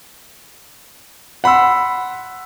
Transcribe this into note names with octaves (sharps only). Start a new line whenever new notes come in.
F#5 B5 C6 E6